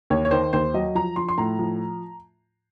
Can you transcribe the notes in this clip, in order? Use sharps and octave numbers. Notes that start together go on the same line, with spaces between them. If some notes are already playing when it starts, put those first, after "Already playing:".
D#2 C#5
C#5
D#3 C5
D#2 C5
F#3 D#5
F3 A#5
F3 C6
C6
A2 A#5
F3